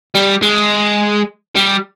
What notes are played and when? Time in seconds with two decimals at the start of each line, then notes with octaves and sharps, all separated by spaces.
0.15 G3
0.42 G#3
1.56 G3